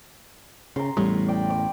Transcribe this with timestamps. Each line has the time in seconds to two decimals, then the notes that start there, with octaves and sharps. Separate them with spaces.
0.76 C#3 A#5 C6
0.97 A1 E2 A2 G3
1.28 D5 G5
1.50 D5